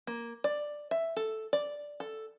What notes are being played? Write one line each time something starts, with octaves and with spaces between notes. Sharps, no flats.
A#3
D5
E5
A4
D5
A4